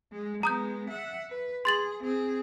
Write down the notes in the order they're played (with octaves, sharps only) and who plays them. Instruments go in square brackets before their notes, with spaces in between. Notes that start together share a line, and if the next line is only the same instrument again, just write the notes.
[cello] G#3
[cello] G#3 B3 [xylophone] A#5 D#6 G6
[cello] E5 F#5
B4
[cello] G#4 [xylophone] C6 A6 F#7
[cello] C4 G#4